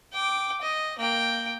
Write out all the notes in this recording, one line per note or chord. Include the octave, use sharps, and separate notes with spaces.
G5 D6
D#5
A#3 G5